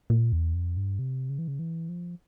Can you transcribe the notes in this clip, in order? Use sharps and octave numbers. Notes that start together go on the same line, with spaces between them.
A#2
E2
F2
G2
C3
C#3
E3
C#3
E3
F3